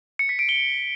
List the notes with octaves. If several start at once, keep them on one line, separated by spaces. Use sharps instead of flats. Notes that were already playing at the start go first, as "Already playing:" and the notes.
C#7
B6
D7
G7